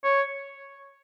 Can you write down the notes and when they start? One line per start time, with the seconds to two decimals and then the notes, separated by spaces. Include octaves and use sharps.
0.04 C#5